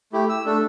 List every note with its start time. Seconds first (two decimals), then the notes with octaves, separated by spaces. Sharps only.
0.13 A3 E4 G4
0.29 E6
0.46 A3 D4 A4